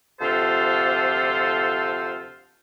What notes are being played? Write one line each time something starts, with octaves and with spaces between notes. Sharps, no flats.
D2 C3 F3 F4 A4 C5